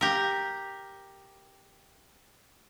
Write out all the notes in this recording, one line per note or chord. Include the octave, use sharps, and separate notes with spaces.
G4 A#4